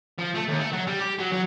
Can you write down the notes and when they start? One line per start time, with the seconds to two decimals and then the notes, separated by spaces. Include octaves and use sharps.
0.19 F3
0.35 A3
0.48 D#2
0.60 A3
0.73 F#3
0.88 G3
1.00 G4
1.19 F#3
1.33 F#3